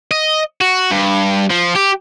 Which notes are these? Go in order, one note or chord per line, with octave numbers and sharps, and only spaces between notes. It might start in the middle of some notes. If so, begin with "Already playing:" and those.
D#5
F#4
G2
F3
G4